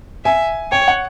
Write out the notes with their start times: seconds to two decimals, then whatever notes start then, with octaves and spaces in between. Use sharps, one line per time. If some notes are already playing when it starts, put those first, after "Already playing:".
0.25 E5 G#5
0.72 C#5 G5
0.88 F#5